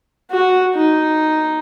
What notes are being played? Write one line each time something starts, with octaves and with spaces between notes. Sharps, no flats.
F#4
D#4